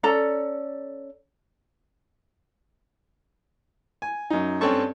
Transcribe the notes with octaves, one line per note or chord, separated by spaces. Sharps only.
C#4 A4 D5 A#5
G#5
F#2 D#4
G2 C4 C#4 A4 A5 C#6